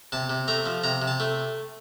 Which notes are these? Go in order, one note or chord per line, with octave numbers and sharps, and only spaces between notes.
C3 A5
C3
A3 A#5
F3
C3 A#5
C3
A5
A3